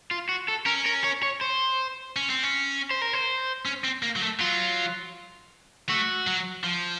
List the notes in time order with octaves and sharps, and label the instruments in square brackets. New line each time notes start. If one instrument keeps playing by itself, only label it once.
[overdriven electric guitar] F4
F#4
A4
[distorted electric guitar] C#4 [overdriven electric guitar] A#4
[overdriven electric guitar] A#4
C#5
C#5
C5
[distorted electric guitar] C#4
C4
C#4
[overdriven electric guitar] C5
A#4
C5
[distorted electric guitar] C#4
C4
A#3
F#3
A3
[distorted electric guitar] F#3 [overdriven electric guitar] F4
[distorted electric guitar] A3 [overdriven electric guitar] F#4
[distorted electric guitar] F#3
F3